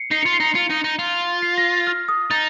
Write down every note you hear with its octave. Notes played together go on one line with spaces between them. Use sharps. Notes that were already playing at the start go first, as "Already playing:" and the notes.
Already playing: C7 C#7
D#4 C7
F4 C#7
C7
D#4 C#7
F4 C#7
D#4
D#4
F4
C7
A#6
F6
D#6
D#4 A6